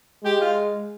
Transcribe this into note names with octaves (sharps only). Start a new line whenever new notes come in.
G#3 G4
F4